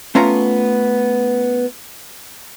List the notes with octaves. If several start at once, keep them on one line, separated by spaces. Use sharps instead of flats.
A3 B3 C#4 F4 A#5